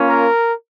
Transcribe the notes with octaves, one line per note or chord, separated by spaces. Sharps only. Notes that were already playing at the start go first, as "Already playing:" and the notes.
Already playing: A#3 C#4 F4
A#4